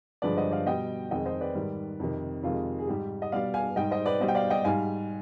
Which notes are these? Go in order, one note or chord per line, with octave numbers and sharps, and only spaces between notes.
G2 D3 F3 G#3 B4 D5
C5 D#5
D5 F5
B2 G3 D#5 G5
F2 D#3 G#3 D#5 G5
C5 D#5
B4 D5
G#2 D#3 G3
F2 C3 D#3
F2 C3 D#3 G#3 F4
G#4
G#2 G3 G4
D#5
B2 G3 D5 F5
F5 G#5
G#2 G3 D#5 G5
C5 D#5
B4 D5
B2 G3 C5 D#5
G5
D5 F5
D#5 G5
G#2 G3 F5 G#5